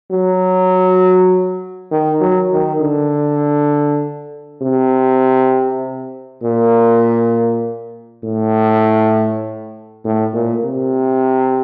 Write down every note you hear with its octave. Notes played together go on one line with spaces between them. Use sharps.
F#3
D#3
F#3
D#3
D3
C3
A#2
A2
A2
A#2
C3